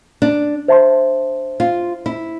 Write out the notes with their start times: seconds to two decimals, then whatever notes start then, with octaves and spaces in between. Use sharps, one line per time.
0.22 D4
0.68 C5 E5 A5 C6
1.60 F4
2.06 E4